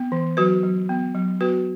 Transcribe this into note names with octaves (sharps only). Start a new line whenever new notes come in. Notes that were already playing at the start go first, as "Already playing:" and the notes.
Already playing: B3
E3
F#3 F#4 B4
F#3
B3
F#3
B3 F#4 B4